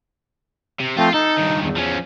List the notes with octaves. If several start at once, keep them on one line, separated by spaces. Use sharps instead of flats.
C3
F3 A3 C4 F4
D#4 A4
G2 D#3
E2
F3 C#4